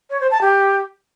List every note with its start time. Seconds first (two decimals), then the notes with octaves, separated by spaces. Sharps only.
0.10 C#5
0.21 C5
0.31 A5
0.41 G4